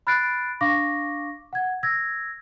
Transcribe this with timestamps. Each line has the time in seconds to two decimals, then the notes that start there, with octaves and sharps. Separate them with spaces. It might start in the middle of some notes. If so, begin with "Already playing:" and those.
0.07 B5 F6 F#6 A6 C7 D7
0.61 D4 F5 C#6 D6 A#6
1.53 F#5 G#6
1.83 E6 G#6 A#6